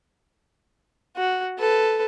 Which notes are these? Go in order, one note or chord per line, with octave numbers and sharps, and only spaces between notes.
F#4
A4 B4